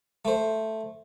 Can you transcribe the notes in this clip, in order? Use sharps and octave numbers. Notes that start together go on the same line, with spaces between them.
A3 C5